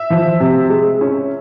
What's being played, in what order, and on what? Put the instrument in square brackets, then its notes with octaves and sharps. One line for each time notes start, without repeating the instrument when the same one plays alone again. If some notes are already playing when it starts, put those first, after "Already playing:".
Already playing: [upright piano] E5
F3
C3
G#3
C#4